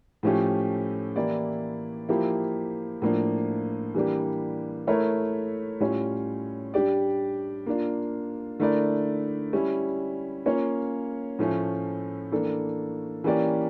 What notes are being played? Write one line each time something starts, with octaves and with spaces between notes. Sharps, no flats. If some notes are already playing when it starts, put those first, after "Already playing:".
A2 F3 A3 C#4 G4
E3 A#3 E4 G4 D5
F3 A#3 E4 G4
A2 F3 A#3 D4
E3 G3 A#3 D4 G4
A3 E4 A#4 C#5
A2 G3 C#4 F4 C#5
G3 D4 G4 D5
A#3 D4 F4
D3 A3 E4 A#4 D5
G3 C#4 E4
A#3 C#4 F4 C#5
A2 F3 A3 C#4
E3 A#3 D4 A4
E3 A#3 C#4 G4 D5